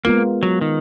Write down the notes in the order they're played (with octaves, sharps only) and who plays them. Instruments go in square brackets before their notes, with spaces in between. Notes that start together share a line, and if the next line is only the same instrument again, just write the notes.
[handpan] G#3 B3 F4 A#4 [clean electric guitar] A#3
[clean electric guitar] F#3
D#3